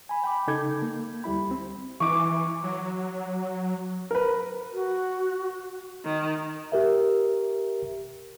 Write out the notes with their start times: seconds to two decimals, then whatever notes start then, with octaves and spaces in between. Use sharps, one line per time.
0.09 G#5 B5
0.24 G5 B5 D6
0.47 C#3 D#4 A4 D6 G6 G#6
0.82 A#3
1.24 D2 G3 E4 B5
1.51 C4
2.00 E3 C#6 D6
2.63 F#3
4.11 A#4 B4
4.74 F#4
6.05 D#3
6.72 G4 A#4 E5